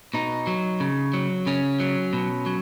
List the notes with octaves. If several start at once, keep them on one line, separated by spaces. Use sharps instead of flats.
B2 D#4
F#3
C#3
F#3
C#3 C#4
F#3
B2
F#3